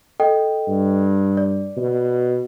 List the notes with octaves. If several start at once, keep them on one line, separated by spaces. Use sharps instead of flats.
A4 D#5 G5
G2
D5
B2